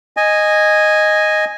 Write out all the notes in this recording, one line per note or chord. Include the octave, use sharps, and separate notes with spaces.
D#5 G#5